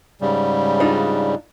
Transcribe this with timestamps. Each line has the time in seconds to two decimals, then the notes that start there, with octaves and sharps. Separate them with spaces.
0.21 G#2 C#3 G3
0.80 D4 D#4 F4